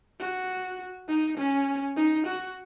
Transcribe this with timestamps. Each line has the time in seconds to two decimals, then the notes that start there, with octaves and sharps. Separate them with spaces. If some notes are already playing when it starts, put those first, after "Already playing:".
0.20 F#4
1.08 D#4
1.38 C#4
1.96 D#4
2.26 F#4